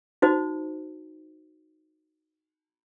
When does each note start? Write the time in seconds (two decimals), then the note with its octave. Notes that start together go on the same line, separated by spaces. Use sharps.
0.22 D#4 F#4 C5